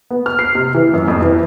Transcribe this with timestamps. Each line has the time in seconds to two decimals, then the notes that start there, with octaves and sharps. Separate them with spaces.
0.11 B3
0.26 F6
0.39 C7
0.55 C3
0.74 E3
0.93 F#2
1.08 F2
1.22 E3